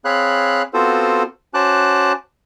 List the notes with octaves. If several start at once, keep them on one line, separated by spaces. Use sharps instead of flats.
C4 G#4 C#5 F5 B5 F#6
B3 C4 F4 F#4 A4 C5
C#4 F#4 C5 A5 D6 F#6